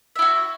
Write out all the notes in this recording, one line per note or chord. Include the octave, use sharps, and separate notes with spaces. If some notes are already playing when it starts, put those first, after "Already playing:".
E4 F#4 E5